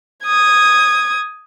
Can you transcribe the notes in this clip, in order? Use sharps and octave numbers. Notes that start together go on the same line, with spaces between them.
D#6 G#6